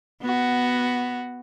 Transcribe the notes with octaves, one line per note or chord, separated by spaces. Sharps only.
B3 F#4